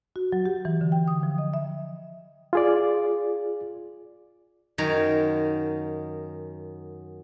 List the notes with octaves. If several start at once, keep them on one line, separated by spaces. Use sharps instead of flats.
F#4
F#3
G4
E3
D3
G5
D#6
F3
D#5
E5
F4 G#4 D5
F#2 D#3 G#5 A#5